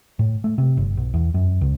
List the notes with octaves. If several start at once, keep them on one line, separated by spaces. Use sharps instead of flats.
A2
A3
C3
G1
B1
E2
F#2
C#2